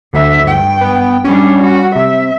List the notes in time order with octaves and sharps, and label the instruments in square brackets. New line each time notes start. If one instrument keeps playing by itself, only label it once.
[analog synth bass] D2 [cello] D3 E5
[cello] G2 G5
[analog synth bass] B3
[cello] G3 D4 [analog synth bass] C#4
[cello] F#4
[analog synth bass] C3 [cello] E5